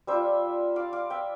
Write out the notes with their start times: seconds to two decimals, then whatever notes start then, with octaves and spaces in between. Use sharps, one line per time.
0.07 G3 D4 F4 C5 E5
0.76 D5 F5
0.93 D5 F5
1.10 E5 G5